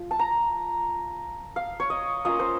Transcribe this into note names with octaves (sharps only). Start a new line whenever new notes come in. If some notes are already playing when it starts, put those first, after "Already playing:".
Already playing: F3 F4
A5
A#5
F5
C#5
D#5
A#3 C#4 F4 D#5
C5